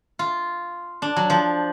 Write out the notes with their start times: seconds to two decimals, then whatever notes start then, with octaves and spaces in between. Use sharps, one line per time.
0.19 F4
1.02 D4
1.16 F#3
1.30 F3